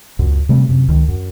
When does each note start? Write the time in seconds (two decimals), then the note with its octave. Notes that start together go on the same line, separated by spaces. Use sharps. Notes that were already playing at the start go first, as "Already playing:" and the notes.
0.19 C#2 F#2
0.49 C3 G3 A3
0.69 F#2 C3
0.88 C#2 D#3
1.08 F#2